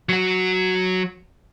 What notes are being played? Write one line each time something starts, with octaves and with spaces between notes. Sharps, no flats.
F#3 F#4